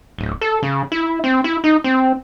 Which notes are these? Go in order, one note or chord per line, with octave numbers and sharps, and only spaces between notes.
D1
A4
C#3
E4
C4
E4
D#4
C4